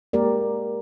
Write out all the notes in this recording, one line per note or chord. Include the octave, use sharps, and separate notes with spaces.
G#3 A#3 G4 A#4 D5